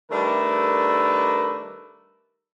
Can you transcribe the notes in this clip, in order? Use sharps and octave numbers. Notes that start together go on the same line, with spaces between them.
D#3 G3 A3 D4 A#4 B4